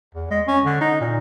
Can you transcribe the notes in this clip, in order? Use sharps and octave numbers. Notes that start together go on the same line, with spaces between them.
E2
G#3
C#4
D3
D#4
A#2